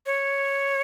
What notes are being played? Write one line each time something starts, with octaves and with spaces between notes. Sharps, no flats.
C#5